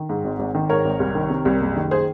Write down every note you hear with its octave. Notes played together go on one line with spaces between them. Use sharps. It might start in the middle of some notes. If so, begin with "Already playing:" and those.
Already playing: D#3
G#2
G#1
G#1
D#3
G#2 A#4 C#5
G#1
C2
D#3
C3
C2
F#1
D#3
G#4 C5